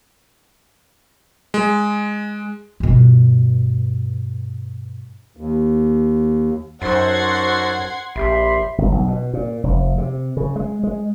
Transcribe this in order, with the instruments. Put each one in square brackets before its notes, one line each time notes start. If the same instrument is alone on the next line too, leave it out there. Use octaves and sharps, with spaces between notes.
[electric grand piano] G#3
[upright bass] G2 B2
[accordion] D#2
[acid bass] F#2 [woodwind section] D#4 F#4 A4 [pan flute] C5 [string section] F#5 C6 G#6
[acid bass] A#1 [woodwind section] G4 B5 C6 [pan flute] E5
[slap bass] G1
B1
B2
A#2
F1
C3
C#3
G#3
G#3